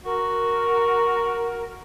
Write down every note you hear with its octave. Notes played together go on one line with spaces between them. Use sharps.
F#4 A#4